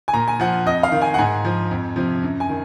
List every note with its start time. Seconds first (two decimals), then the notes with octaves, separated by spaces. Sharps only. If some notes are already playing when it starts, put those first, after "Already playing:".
0.08 G#5
0.14 A#2 A#5
0.28 G#5
0.40 F3 F#5
0.66 F2 D#5
0.83 F5
0.92 D#3
1.02 G#5
1.14 F#5
1.18 G#2 G#5
1.45 F3
1.71 F2
1.96 C3 F3
2.23 F#2
2.40 G#5
2.49 D#3